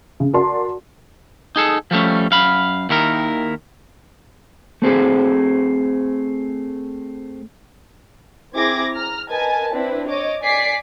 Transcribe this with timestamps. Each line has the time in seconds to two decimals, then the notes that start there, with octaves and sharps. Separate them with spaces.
0.20 C#3
0.33 F#4 A#4 D5 A5 C6
1.56 D#4 G#4 A4
1.91 F3 G3 A3 C#4
2.31 F#2 F5 B5
2.89 D#2 D#3 E4 A#4
4.82 A3 C4 G#4 C5
8.55 C4 E4 G#4 D6 G#6 A#6
8.94 A#5 F6
9.30 A#4 B4 D#5 G#5 A5
9.72 C4 D4 E4 B4
10.07 C#5 D#5 D6
10.42 D5 G#5 D6 B6 C7